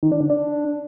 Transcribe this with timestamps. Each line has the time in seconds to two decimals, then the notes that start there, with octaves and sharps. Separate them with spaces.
0.03 D#3
0.12 D4
0.21 D3
0.30 D4